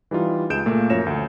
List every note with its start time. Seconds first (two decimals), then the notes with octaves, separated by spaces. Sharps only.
0.11 E3 G3 D#4 F4
0.50 C#2 G#4 G6 D7 E7
0.66 A#2 A3 A#3
0.90 F#2 F3 F4 C#5 A#6 E7
1.06 D2